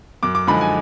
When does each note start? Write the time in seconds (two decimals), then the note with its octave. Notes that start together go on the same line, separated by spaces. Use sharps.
0.23 F#2 D6
0.35 D6
0.47 D3 F3 G#3 D#4 B5
0.61 G#5